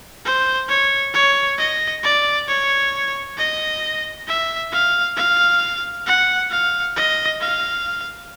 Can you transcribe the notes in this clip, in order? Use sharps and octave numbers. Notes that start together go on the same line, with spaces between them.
C5
C#5
C#5
D#5
D5
C#5
D#5
E5
F5
F5
F#5
F5
D#5
F5